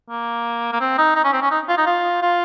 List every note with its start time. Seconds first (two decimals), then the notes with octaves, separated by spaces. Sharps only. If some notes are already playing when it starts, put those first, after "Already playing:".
0.09 A#3
0.73 A#3
0.80 C4
0.98 D#4
1.16 D#4
1.24 C#4
1.33 C4
1.42 C#4
1.51 D#4
1.69 F4
1.78 D#4
1.86 F4
2.22 F4